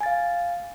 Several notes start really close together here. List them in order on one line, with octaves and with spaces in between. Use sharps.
G#5 A6 F5